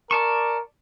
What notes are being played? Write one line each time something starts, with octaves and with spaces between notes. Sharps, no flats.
A#4 D5 A5 C#6